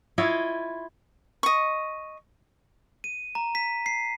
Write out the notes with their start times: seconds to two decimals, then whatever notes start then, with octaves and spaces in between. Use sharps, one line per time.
0.18 E4 F4 C#5 D#5
1.43 D#5 C#6
3.04 D#7
3.35 A#5
3.55 B6
3.86 C7